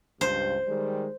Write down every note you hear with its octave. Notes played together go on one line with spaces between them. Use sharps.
C#2 G2 C5
D#3 G3 G#3